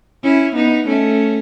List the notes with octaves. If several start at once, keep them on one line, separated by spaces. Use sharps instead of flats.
C#4 E4
B3 D#4
A3 C#4